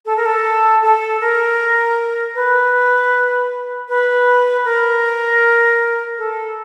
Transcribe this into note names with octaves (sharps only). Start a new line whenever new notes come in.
A4
A#4
A4
A4
A#4
B4
B4
A#4
A4